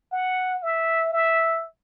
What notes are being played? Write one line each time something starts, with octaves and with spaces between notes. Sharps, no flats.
F#5
E5
E5